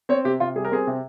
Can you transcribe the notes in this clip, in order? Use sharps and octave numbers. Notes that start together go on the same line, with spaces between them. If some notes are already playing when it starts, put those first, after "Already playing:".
C4 C#5
C3 G4
C3 F4
G3 G#4
A#4
C4 G#4
C3